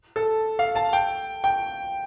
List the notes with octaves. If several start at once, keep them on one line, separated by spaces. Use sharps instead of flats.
A4
F5
A5
G5
G5